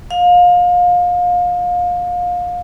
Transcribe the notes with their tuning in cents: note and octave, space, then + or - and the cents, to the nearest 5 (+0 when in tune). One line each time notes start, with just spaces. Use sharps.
F5 +30